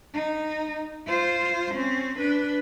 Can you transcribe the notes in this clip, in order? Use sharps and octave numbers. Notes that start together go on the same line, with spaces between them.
D#4
F4 C5
C4 C#4
D4 B4